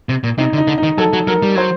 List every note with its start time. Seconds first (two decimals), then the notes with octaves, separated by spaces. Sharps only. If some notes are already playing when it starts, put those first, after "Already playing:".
0.09 C3
0.24 A#2
0.38 C3 D#4
0.53 D3
0.58 D#4
0.67 D3
0.78 D#4
0.83 D#3
0.98 F#3 A4
1.13 F#3
1.27 F#3 A#4
1.42 G3
1.55 F#3 C5